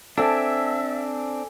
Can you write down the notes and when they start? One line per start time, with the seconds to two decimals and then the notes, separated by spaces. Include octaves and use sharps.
0.18 C4 D4 A4 E5 G#5